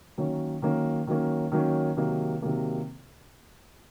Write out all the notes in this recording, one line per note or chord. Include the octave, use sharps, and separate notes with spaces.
D#3 F#3 A#3 C#4
D#3 F#3 A#3 C#4
D#3 F#3 A#3 C#4
D#3 F#3 A#3 C#4
C3 D#3 F#3 A#3
C3 D#3 F#3 A#3